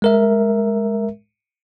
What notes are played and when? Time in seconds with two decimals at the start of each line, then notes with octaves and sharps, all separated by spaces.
0.02 G#3 A#4 E5